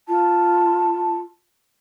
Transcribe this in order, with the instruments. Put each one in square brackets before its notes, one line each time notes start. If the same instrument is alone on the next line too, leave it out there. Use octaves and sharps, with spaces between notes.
[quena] F4 [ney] A5